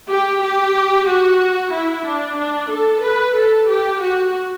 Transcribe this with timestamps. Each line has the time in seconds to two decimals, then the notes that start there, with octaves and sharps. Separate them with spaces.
0.10 G4
0.42 G4
1.07 F#4
1.73 E4
2.06 D4
2.38 D4
2.71 A4
3.03 B4
3.36 A4
3.69 G4
4.01 F#4